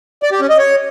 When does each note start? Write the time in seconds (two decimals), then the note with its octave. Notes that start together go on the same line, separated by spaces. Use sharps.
0.23 D5
0.32 G4
0.41 C#4
0.50 D#5
0.59 C#5